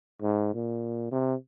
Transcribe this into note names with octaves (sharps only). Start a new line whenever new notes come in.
G#2
A#2
C3